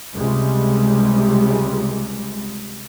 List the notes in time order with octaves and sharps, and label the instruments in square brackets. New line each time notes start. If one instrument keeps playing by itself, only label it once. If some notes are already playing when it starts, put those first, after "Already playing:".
[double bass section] C#2 C3 G3 G#3